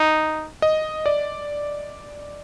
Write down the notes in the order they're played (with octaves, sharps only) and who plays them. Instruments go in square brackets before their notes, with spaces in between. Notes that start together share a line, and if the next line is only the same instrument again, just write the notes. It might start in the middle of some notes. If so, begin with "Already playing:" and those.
Already playing: [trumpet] D#4
[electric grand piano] D#5
D5